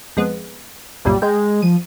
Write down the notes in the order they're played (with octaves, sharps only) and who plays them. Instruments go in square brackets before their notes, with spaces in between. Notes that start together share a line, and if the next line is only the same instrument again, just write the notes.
[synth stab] F2 G#3 B3
[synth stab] C2 F#2 A#2 [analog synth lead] G3
[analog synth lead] G#3 [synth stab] G5
[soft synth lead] F3 [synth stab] D#7